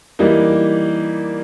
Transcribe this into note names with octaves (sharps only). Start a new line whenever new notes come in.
E3 G3 A#3 D#4